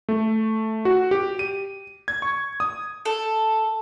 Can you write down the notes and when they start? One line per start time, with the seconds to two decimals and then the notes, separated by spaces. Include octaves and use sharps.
0.09 A3
0.85 F#4
1.11 G4
1.39 D#7
2.08 G#6
2.22 C#6
2.60 D#6
3.05 A4